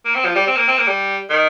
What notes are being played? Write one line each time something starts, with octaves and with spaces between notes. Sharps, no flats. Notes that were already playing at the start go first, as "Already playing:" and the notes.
A#3
C4
F3
G3
C4
A#3
C4
A#3
G3
D#3